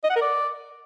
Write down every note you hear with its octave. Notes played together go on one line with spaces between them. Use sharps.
D#5
F#5
A#4
D5